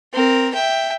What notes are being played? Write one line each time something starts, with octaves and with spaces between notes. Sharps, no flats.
C4 A#4
E5 G5